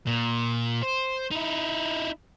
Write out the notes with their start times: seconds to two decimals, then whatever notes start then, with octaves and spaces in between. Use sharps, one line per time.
0.06 A#2
0.83 C5
1.31 D#4 E4